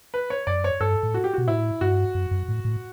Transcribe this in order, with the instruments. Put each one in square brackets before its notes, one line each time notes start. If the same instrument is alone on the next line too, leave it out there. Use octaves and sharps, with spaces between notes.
[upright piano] B4
C#5
[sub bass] F#2 [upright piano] D5
[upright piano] C#5
[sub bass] G2 [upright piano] A4
[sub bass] A2
[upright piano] F#4
G4
[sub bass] B2 [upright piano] F#4
[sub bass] A2 [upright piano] E4
[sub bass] G2 [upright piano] F#4
[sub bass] F#2
F#2
A2
A2